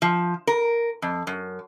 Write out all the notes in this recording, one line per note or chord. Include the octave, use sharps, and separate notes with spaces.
F3
A#4
F2
F#2